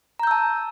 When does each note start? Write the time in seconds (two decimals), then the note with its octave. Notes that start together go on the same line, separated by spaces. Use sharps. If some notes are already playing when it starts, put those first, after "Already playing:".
0.20 A#5
0.23 G6
0.27 E6
0.31 A5